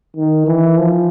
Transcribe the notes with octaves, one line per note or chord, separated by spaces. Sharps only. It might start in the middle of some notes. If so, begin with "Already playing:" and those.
D#3
E3
F3